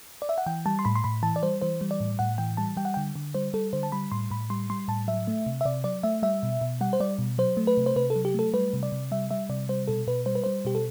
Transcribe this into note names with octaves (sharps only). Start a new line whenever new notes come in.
D5
E5
F#5
E3 G5
G3 A5
C6
A2 B5
C6
A2 B5
E3 A5
D5
G3 C5
E3 C5
G3
D5
A2
A2 F#5
E3 G5
G3 A5
G3 G5
F#5
D3 G5
D3
G3 C5
G3 A4
D3 C5
A5
G3 B5
A2 C6
A2 B5
G3 C6
G3 C6
A2 A5
F#3 E5
A3
C3
E5
C3 D5
F#3 D5
A3 E5
G3 E5
B2
B2
G3 F#5
C5
G3 D5
B2
F#3 C5
A3
B4
C3
C5
C3 B4
A4
F#3
G4
A3 A4
G3 B4
C3
D5
C3
G3 E5
G3 E5
C3 D5
G3 C5
B2 A4
B2 B4
G3 C5
B4
G3 C5
B2 G4
A4